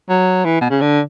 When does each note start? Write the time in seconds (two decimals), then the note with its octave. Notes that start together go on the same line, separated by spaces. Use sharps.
0.09 F#3
0.45 E3
0.61 B2
0.70 C#3
0.81 D3